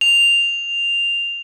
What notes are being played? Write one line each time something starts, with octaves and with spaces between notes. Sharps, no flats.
F7